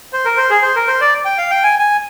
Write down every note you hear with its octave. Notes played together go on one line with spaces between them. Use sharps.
C5
A#4
C5
G#4
C5
A#4
C5
D5
G5
F5
G5
G#5
G#5